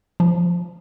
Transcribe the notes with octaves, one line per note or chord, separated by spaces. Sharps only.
F3